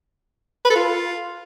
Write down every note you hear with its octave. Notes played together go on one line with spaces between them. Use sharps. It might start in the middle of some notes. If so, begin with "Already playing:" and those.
B4
A4
F4